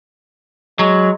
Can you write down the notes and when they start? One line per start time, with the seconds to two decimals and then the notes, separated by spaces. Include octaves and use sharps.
0.79 F#3 G#3